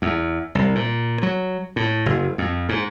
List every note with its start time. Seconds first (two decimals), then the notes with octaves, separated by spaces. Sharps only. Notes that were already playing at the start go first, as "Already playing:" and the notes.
0.02 E2
0.55 C2
0.75 A#2
1.23 F#3
1.76 A2
2.06 F#1
2.38 F2
2.69 G#2